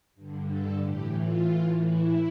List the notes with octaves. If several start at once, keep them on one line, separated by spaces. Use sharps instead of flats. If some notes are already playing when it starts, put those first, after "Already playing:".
G2 D3
A4
A2 E3 G4
F4
A2 E3
E4